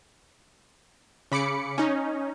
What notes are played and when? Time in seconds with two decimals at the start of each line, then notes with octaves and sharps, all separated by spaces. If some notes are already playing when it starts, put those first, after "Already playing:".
1.32 C#3 B5 D6 C#7
1.78 C#4 D#4